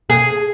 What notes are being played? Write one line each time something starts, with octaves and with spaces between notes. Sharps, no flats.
G#4